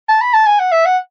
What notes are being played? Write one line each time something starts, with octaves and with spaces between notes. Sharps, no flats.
A5
B5
A5
G#5
F#5
E5
F#5